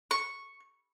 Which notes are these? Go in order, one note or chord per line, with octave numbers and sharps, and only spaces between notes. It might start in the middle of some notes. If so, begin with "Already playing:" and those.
C#6